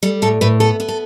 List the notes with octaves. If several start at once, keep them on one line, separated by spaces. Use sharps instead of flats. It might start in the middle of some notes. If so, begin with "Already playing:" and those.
G3 A4
A2 A4
A2 B4
B3 A4
B3
A4